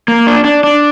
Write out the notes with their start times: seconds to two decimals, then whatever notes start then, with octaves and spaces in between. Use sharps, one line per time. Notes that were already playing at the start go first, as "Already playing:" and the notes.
0.08 A#3
0.27 D4
0.45 D4
0.64 D4